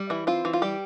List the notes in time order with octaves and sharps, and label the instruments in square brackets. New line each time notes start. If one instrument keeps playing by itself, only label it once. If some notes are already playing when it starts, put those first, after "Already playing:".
Already playing: [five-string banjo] G3
E3 E4
C4 F4
E3
F4
G3 G4